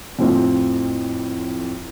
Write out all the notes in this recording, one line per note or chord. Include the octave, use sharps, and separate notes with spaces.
F2 A2 C4 F4